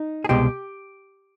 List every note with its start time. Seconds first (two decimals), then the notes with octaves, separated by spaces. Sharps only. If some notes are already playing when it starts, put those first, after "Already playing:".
Already playing: D#4
0.24 G#4
0.29 C2 B2 G#3 G4